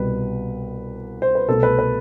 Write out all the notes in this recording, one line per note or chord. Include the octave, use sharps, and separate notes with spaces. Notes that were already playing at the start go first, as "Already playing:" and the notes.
Already playing: C2 B2 G3 B4
C5
B4
C2 B2 A3 A4
B4
B4